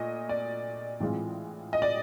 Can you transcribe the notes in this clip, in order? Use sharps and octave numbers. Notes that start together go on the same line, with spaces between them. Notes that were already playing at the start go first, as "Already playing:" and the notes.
Already playing: A#2 A3 D#5
D5
A2 E3 G#3 C4 F4
D#5
D5